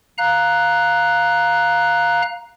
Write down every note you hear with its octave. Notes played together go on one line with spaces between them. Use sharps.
F5 A#5 F#6